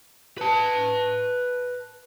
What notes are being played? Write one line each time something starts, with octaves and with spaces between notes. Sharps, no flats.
B4 A5